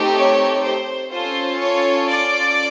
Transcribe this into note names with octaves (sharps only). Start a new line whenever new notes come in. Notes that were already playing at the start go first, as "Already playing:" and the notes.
Already playing: A3 C4 D#4 G4
C#5
C5
C#4 F4 A4 C5
C#5
D5